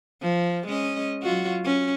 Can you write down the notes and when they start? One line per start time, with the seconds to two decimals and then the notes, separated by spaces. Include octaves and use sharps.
0.22 F3
0.67 G#3 C#4 D#5
1.22 F#3 F4 F#4
1.64 C#4